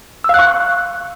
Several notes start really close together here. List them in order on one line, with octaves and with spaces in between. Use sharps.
E6 F5 F#6 C#6